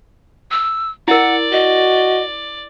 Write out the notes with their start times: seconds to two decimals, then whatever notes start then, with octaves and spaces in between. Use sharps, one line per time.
0.51 E6
1.08 E4 A#4 D5 F#5
1.52 F#4 D#5